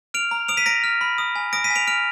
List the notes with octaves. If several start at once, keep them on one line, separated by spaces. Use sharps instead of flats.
F6 D7 F7
A#5
D#6 D7 F7
B6 D#7
A#5 A#6 D7
F6
B5
D#6
G#5
D#6 A#6 D7
B6 D#7
G#5
D7 F7
F6 D7 F7